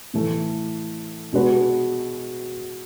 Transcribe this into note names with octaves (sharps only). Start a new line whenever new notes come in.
A2 E3 A3
B2 G#3 D4 F#4 B4